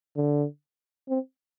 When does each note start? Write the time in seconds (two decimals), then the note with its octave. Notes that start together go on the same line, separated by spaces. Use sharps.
0.16 D3
1.09 C4